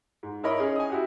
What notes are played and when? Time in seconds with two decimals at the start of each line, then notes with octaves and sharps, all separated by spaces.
0.23 G#2
0.44 E4 A#4 C#5 D#5 B5
0.60 C#4 D#4 G#4
0.76 G#5 D#6
0.90 E4 F#4 G4